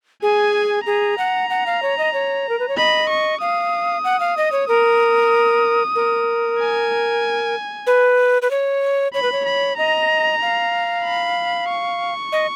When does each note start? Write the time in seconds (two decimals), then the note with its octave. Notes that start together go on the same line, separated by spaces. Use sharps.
0.22 G#4 G#5
0.86 G#4 A#5
1.18 F#5
1.50 F#5
1.66 F5
1.82 C#5
1.98 D#5
2.13 C#5
2.49 A#4
2.59 B4
2.68 C#5
2.77 D#5 B5
3.09 C#6
3.41 F5 D#6
4.04 F#5
4.20 F5
4.37 D#5
4.52 C#5
4.68 A#4 D#6
5.95 A#4
6.59 G#5
7.87 B4
8.42 B4
8.51 C#5
9.14 C#5 B5
9.22 B4
9.32 C#5
9.46 B5
9.77 D#5 A#5
10.42 F5
11.04 B5
11.69 C#6
12.32 D#5